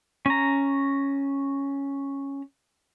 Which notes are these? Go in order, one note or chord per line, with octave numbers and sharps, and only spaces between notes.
C#4 A#5